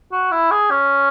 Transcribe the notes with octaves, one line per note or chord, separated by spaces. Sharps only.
F#4
E4
G#4
C#4